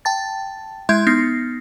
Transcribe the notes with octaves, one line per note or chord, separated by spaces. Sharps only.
G5 A5 A6
G#3 E4 E5 C6 G6 G#6
B3 D#4 F6 A#6 C7